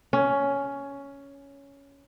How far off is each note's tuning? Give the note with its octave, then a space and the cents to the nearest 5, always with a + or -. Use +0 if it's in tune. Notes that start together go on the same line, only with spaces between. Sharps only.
C#4 +10